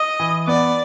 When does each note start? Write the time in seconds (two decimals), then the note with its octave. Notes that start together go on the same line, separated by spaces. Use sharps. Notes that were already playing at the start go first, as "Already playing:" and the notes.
Already playing: D#5
0.20 E3
0.47 B3 D5